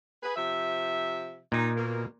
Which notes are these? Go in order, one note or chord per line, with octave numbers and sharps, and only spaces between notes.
G#4 B4
C3 F3 E5
A#2 D#4
B2 A#3